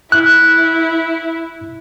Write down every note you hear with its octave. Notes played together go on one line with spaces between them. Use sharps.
E4 F#6